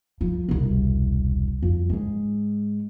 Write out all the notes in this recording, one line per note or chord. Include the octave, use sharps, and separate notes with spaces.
F3
E1 C2
F2
G#2 G#3